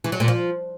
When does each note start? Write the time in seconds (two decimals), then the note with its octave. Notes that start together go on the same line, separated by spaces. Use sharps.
0.04 E3
0.12 F#3
0.20 A#2
0.28 F3